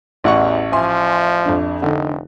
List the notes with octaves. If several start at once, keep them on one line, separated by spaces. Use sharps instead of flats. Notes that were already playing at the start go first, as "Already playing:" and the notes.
A1 E2 F#5 C#6
F3 E5 G#5 C6
F2 D4
F1 D3 D#4